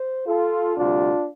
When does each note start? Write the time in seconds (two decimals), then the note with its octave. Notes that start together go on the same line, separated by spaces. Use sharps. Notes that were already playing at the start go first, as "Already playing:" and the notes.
Already playing: C5
0.27 F4 A4
0.76 D2 C3 G3 D4 F4